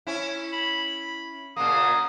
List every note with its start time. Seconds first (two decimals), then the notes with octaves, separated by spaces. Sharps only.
0.07 C#4 E4
0.53 B5
1.56 A#2 C#3 A#3 D#6